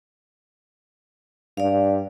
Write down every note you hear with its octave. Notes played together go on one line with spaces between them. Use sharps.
G2 D5 F5